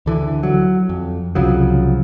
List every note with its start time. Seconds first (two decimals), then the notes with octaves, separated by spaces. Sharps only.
0.06 D2 D3 E3
0.43 F#3
0.89 F2
1.35 C2 C#3 F3 F#3